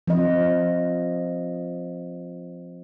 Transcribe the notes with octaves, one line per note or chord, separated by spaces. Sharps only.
F3 C4 D#5